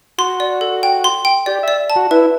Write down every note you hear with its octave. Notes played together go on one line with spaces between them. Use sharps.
F#4 C6
D5
A4
G5
C6
G5
G4 D5
D5 E5
A5
F#4
E4 B4